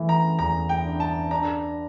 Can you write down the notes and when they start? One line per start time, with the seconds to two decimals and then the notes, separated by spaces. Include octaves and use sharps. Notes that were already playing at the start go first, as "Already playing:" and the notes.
Already playing: E3 A3
0.09 A#5
0.39 E2 A#5
0.69 G5
0.85 D4
1.00 A5
1.31 D4 A#5